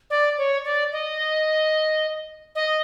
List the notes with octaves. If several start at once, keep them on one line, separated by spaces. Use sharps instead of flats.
D5
C#5
D5
D#5
D#5